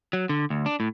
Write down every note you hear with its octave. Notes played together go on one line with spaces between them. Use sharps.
F#3
D3
D2
D4
A2